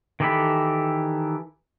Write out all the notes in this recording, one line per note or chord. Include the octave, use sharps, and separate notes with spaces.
D#3 E3 G4 A4 B5